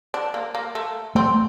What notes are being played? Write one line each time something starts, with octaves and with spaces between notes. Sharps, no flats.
D4
A#3
A#3
A3
A3 C4